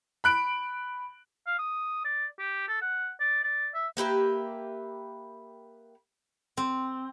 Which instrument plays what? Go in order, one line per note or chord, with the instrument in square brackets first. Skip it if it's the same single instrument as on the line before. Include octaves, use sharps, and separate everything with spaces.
[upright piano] B5 F#6 D7
[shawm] F5
D#6
D5
G4
A4
F#5
D5
D5
E5
[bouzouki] A#3 G4 B4 E5
[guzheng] C4